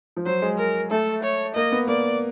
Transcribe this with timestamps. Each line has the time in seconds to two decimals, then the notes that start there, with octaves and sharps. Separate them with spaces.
0.17 F3
0.26 F#3 C5
0.42 G#3
0.58 A#4
0.91 A3 A4
1.23 C#5
1.55 A#3 D#5
1.72 B3
1.87 A#3 D5